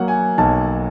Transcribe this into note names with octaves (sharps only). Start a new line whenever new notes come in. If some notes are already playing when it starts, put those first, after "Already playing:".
Already playing: F#3 A#3 F#5
G#5
B1 A5